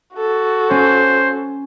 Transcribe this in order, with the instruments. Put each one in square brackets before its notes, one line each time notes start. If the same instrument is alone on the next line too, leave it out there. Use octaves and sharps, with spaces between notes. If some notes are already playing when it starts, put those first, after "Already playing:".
[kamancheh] F#4 A4
[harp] C#4 [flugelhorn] C5